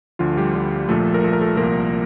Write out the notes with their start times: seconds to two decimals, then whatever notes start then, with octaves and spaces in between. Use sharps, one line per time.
0.19 D2 D3 F3 F4
0.37 G3 G4
0.55 D2 D3 F3
0.89 A#1 A#2 F3 A3 A4
1.06 A4
1.14 A#4
1.23 A#1 A#2 F3 A4
1.33 A#4
1.41 A3 A4
1.57 C2 A#2 F3 A#3 A#4